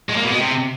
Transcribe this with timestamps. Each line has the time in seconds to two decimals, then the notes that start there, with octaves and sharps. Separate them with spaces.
0.09 G#3
0.16 A#3
0.23 B2
0.31 G#3
0.38 C3